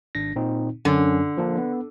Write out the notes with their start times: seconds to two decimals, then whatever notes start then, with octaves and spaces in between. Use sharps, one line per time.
0.15 G#1 D4 A#6
0.36 A#2 C4 D#4
0.85 F#2 D3 C#4
1.38 F3 A#3 D4
1.58 B3